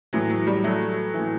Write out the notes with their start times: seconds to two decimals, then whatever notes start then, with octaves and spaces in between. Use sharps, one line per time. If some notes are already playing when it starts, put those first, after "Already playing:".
0.13 A2 E3 F#3
0.30 F#3
0.47 G3
0.64 F#3 A3
1.14 E3
1.19 A2